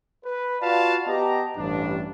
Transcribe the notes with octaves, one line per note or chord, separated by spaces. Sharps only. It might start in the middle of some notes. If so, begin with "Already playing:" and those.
B4
F4 F#4 B4 D5 F5 A5
B3 G4 D#5 A5 A#5
A1 G2 D4